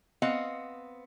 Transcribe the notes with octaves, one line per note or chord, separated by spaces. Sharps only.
B3 C4 D#5 F5 F#5